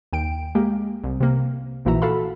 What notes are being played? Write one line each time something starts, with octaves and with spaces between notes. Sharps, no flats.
D#2 G5 D7
G#3 A#3 G4
C2
C3 A#3
A#1 A#2 E3 F#4 E5 A#5
F#4 A4 F5 B5